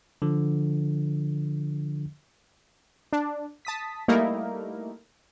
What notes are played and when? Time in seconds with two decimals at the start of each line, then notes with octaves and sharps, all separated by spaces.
0.22 D3 F3
3.13 D4
3.65 A5 D#6 B6
4.08 G3 A3 A#3 D#4 E4 A#4